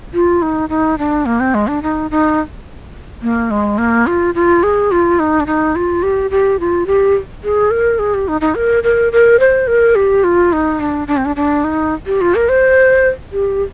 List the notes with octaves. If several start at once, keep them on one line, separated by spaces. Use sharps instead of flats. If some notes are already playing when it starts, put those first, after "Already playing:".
F4
D#4
D#4
D4
A#3
C4
G#3
D4
D#4
D#4
A#3
G#3
A#3
F4
F4
G#4
F4
D#4
D4
D#4
F4
G4
G4
F4
G4
G#4
A#4
G#4
G4
D#4
D#4
A#4
A#4
A#4
C5
A#4
G4
F4
D#4
D4
D4
C4
D4
D4
D#4
G4
F4
A#4
C5
G4